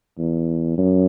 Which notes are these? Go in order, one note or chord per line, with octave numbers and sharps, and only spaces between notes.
E2
F#2